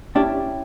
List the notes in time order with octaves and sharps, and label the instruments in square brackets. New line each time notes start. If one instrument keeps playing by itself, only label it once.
[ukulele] C#4 E4 G4 [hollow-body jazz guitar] D4